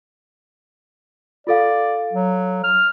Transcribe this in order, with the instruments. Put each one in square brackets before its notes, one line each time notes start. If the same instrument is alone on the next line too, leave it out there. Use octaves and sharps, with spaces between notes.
[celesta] F4 A4 F5 [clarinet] D5
[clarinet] F#3
F6